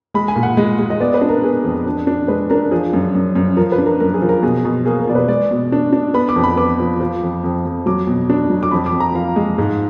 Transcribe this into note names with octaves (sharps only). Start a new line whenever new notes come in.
G#3 B5
G#5
A#2
F#5
G#3
G#3
D#5
B3 D5
B4
D4
A#4
B3 G#4
F2
D4
D4
G#3 B4
D4 A#4
F3 G#4
F#2
F#2
F#2
F3 A#4
B4
D4
A#4
F#2 A#4
G#4
F3
A#4
B2 G#4
B2
A#3 G#4
A#4
B2 D5
B4
G#3 D5
B2
D4
D4
B3 B5
D6
F2
B5
B3 D6
F3
F3
F2
F2
F2
F#3 D6
B2
D4
F#3
D6
F2 B5
D6
F2
A#5
F3 F5
G#3
G#2